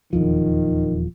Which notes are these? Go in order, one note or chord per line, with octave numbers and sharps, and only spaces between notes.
D#1 E2 D#3 F3